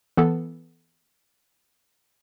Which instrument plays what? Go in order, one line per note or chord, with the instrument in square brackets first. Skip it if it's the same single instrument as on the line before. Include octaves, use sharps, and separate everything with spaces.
[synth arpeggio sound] E3 B3 A4